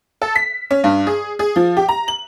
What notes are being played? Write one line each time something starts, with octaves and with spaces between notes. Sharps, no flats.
A4
B6
C#4
G2
G#4
G#4
F3
G4
A#5
F#7